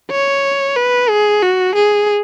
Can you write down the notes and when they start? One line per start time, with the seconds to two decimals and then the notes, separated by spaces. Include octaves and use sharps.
0.11 C#5
0.76 B4
1.10 G#4
1.42 F#4
1.75 G#4